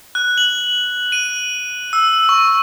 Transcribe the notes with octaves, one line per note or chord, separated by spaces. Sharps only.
F#6
F#7
D#7
E6
C#6